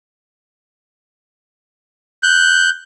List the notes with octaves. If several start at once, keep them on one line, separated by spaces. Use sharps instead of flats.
F#6 G6